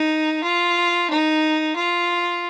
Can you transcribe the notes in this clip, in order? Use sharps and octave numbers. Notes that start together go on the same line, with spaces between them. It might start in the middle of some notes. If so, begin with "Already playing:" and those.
Already playing: D#4
F4
D#4
F4